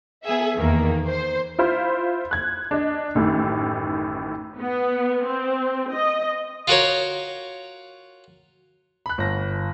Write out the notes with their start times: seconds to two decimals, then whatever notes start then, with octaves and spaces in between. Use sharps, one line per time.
0.24 B3 G#4 E5
0.57 E2 D#3 A#3
1.08 C5
1.59 E4 F4 C5 B5
2.31 F#6 G#6
2.71 D4 D#5
3.15 A1 F#2 A2 D#3
4.59 B3
5.25 C4
5.94 D#5
6.68 F4 F#4 A#4 C#5
9.06 B5 F#6
9.18 G1 A#6